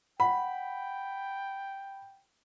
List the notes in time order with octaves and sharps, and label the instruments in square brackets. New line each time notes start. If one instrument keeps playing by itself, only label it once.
[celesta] F#5 [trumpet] G5 [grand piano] B5